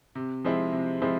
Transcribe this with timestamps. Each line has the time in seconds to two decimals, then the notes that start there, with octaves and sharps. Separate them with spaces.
0.15 C3
0.44 F3 G#3 C4 E4
0.73 C3
1.02 F3 G#3 C4 E4